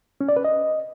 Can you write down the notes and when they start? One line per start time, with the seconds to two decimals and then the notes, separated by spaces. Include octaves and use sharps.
0.21 C#4
0.29 D5
0.36 B4
0.44 D#5